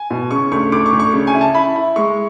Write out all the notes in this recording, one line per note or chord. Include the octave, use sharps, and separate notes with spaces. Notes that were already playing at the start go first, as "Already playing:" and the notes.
Already playing: G#5
B2
C#3 C#6
D2 C#6
D2 D6
C#6
D2
C#6
C#3
G#5
E4
A5
E4 B5
E4
G#3 C#6